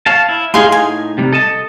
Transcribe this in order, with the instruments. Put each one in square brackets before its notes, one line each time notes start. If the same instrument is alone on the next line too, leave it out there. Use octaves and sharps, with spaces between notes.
[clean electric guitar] C#5 F5 A5
E4
[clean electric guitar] A2 D#4 [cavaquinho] G#4 F5 C6
[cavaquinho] G#5
[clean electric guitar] C3 G3
A4 D#5 A5